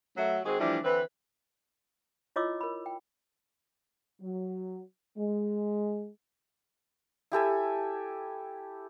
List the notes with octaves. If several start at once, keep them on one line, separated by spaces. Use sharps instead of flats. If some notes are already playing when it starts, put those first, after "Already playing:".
F#3 A3 E5
D#3 G#3 C4 F#4 G#4
E3 F3 G3 A3 D4 E4
D3 E3 C4 B4
E4 F4 C#5 D#5 D6 E6
A#4 B5
G5
F#3
G#3
E4 G4 A4 G#5